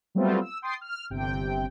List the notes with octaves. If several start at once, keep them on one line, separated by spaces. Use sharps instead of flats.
F#3 G3 A3 B3 C4 F4
E6
G5 C6 D#6 A6 C7
F6
G1 C3 G5